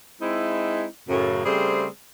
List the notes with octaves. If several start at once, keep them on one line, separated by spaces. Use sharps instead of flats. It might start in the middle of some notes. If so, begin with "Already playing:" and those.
G#3 C4 D#4 E4
F#2 A2 C#3
C#3 G3 A3 C4 G#4 C5